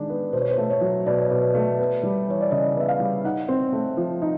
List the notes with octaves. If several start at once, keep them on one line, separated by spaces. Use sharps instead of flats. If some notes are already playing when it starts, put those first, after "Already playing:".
Already playing: D#3 G#3 D4
B3
B2 C5
C#5
C5
A3
C#5
F#3
B2 D5
C#5
B2 D5
A3
B3
G3
E3 C#5
D5
C#3 D#5
B3 E5
F5
G3
D#4 F#5
C4
A3
F3
D#4